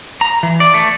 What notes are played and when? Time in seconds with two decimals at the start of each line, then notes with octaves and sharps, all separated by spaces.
0.21 A#5
0.43 E3
0.60 D5
0.74 A3